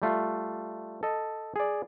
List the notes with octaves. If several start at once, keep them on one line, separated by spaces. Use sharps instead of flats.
G3 A3 F4
A4 D#5
G#4 D5